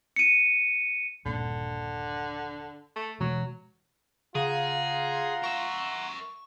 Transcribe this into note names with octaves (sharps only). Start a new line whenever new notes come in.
C#7 D#7
D#1 G2 A#2 D3
A3
B2 E3 F#3 G#3
C#3 F4 G#4 F#5 A#5 C6
A#4 E5 C#6